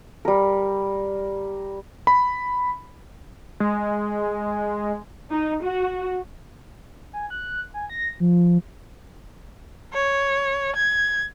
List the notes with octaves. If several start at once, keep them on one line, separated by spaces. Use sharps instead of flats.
G3 A#4
B5
G#3
D#4
F#4
G#5
F#6
G#5
A#6
F3
C#5
G#6